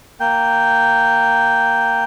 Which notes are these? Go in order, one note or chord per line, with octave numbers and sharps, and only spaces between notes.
A#3 G5